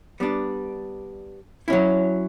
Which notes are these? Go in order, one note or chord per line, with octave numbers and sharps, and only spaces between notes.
G3 B3 D4
F#3 C#4 E4